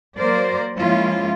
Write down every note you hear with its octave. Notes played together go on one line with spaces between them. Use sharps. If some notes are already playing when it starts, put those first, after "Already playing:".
F#3 A#3 A#4 C5 D5
F3 G#3 A#3 C#4 E4 F4